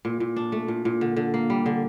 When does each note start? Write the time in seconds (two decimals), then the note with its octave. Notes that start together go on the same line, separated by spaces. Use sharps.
0.05 A#2
0.20 A#2
0.36 D4
0.52 A3
0.68 A#2
0.85 A#2
1.01 D3
1.16 D3
1.34 A#3
1.50 G3
1.66 D3